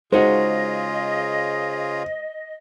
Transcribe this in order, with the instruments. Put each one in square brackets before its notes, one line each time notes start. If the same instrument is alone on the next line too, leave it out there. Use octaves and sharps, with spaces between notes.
[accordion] C#3 F4 G#4 [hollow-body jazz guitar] G#3 D#4 F#4 [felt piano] C5 [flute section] D#5